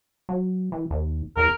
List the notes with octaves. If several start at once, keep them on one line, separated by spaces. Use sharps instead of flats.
F#3
E3
D#2
E2 A#4